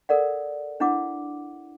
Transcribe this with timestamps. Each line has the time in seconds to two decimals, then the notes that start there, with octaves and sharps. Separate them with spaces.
0.09 A4 A#4 D5 F#5
0.80 D4 E4 F#5 D6